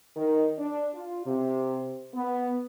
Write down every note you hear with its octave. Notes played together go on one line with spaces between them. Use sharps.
D#3
D4
F4
C3
B3